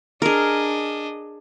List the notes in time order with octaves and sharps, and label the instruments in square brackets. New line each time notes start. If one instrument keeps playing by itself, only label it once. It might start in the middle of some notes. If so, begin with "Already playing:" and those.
[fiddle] D4 D#5 [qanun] G#4 A#4